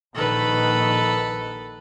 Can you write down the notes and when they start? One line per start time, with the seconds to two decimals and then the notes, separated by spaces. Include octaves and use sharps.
0.15 A#1 D#3 A4 B4